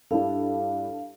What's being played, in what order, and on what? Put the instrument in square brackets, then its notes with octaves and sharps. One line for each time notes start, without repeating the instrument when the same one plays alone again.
[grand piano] G2 G3 E4 [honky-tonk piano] D4 A4 [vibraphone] F5